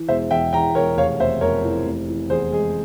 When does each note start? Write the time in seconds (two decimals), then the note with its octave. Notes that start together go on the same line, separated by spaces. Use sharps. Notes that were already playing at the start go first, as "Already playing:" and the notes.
Already playing: E3
0.08 E1 C5 E5
0.31 E2 E5 G5
0.53 E2 G5 A#5
0.75 E1 A#4 C#5
0.97 F1 C#5 F5
1.20 F1 C5 E5
1.41 F2 A#4 C#5
1.64 E3
1.86 F1
2.08 E3
2.30 E2 G#4 C5
2.52 G#3 G#4